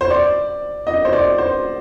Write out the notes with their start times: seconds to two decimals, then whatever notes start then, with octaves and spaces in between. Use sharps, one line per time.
0.01 C5
0.10 D5
0.87 D#5
1.05 C5
1.13 D5
1.38 C5